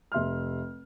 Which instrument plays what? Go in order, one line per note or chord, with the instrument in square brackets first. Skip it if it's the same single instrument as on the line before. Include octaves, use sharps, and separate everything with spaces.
[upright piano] F1 E5 C6 F6